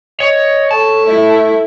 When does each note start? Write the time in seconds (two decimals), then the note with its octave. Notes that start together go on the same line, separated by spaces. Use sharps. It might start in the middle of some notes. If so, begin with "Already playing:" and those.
0.20 C#5 D#5
0.71 A4 C#5 A5
1.06 A3 E4